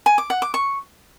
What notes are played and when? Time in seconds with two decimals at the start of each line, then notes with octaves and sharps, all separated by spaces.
0.06 G#5
0.18 D6
0.30 F#5
0.42 D6
0.54 C#6